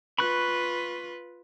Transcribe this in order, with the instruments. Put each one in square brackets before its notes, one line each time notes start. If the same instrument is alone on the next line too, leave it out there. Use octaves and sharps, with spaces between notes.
[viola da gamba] F4 B4 [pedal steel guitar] B5 C#6 F#6